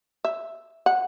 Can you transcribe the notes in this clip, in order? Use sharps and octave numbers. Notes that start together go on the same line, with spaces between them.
E5
F#5